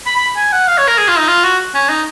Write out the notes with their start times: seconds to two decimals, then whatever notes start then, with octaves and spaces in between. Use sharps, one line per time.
0.06 B5
0.16 B5
0.36 G#5
0.52 F#5
0.68 F5
0.78 C#5
0.88 A#4
0.98 G#4
1.08 F4
1.18 D#4
1.29 F4
1.44 F#4
1.75 C#4
1.89 D#4